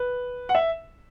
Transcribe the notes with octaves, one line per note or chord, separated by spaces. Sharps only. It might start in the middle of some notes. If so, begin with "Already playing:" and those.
Already playing: B4
F#5
E5